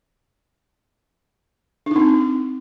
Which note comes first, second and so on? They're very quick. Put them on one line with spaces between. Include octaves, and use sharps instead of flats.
D4 D#4 C4